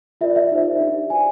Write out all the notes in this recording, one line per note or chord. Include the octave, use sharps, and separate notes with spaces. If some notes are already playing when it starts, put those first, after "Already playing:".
F4 A#4 D5 E5
E5
D#4 G4 C5
D4 G4 C5
F#4 B4 D5 G#5